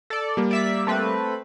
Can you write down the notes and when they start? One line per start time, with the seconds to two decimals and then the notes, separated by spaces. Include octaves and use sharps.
0.10 A4 D5
0.37 G3 A#3
0.51 D5 E5 B6
0.87 A3 C4 B4